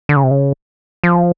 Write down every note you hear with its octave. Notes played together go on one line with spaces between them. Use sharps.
D3
C#3
C3
C#3
F3